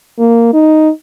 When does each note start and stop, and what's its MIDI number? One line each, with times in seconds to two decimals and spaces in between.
0.19 0.51 58
0.54 0.90 63